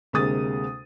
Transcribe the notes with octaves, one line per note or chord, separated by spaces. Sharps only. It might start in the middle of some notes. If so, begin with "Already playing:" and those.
D2 C3 G#3 A#3 D#6 A6